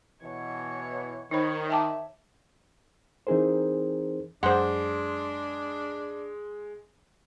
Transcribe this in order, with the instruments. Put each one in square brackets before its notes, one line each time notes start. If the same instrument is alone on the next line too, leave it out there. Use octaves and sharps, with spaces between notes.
[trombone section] B2 E3 [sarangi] C#5
[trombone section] D#3 [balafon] D#4 C5 B5 [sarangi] C#5
[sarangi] E5 [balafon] G5 A5 D6
[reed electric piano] E3 C4 D#4 G#4 A#4 C5
[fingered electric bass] F#2 [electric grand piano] G#3 C6 [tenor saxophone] D4 [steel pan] C5 F#5